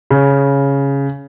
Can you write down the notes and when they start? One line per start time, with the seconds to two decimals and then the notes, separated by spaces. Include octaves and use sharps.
0.10 C#3